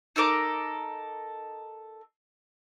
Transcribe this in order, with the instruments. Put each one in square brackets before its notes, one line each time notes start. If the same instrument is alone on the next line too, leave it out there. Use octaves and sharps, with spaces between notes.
[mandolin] D#4 A4 A#4 D6